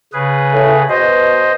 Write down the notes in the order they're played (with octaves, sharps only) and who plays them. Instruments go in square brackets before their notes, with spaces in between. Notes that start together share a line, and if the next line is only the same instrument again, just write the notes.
[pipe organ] C#3 G#4 B4
[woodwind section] A2
[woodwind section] B2 [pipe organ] C5 D#5